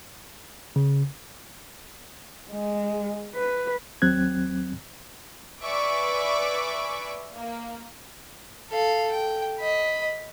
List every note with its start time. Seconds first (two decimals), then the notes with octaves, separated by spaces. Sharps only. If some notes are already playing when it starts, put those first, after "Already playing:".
0.76 C#3
2.51 G#3
3.35 B4
4.02 D#2 F#3 C4 F#6 G#6
5.62 B4 D5 E5 G#5 C#6 D6
7.37 A#3
8.70 A4 F5
9.12 G5
9.60 D#5 B5